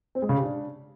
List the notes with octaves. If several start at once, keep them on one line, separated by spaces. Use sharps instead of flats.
C4
G#3
C#3
G4
D4